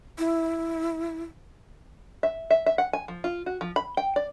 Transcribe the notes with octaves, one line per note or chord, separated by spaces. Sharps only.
E4
E5
E5
E5
F#5
G#5
F3
F4
F#4
F3
B5
G5
D5